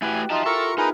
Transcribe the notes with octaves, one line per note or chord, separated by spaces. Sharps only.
A3 E4 F#4 G4 B4 G5 G#5
D#4 F4 E5 A5 C6
E4 F4 A4 A#4 A#5 C#6
B3 D#4 G#4 A#4 B4 G#5